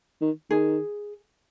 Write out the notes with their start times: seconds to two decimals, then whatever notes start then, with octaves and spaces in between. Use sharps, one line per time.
0.21 D#3
0.51 D#3 G#4